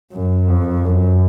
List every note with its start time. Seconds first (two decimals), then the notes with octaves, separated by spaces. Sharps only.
0.13 F#2
0.49 F2
0.85 F#2